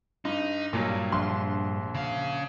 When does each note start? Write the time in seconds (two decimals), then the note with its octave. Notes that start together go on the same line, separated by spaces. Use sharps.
0.25 G2 D#4
0.73 G2 A#2 F#3 G3
1.12 A#1 C6
1.95 C#3 F5